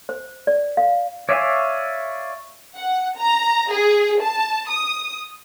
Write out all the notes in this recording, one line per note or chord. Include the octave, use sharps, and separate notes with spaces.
C5
D5
F5
C#5 D5 E5 F5 G#5
F#5
A#5
G#4
A5
D#6